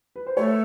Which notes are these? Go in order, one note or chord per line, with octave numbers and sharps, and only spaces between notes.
B4
C5
A3 B4 C#5